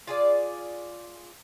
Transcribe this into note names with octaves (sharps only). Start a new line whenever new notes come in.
F4 G#4 D5